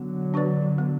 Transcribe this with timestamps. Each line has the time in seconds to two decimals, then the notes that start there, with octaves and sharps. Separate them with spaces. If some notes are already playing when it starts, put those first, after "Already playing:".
Already playing: D3 F#3 B3
0.34 D4 F#4 B4 D5
0.78 B3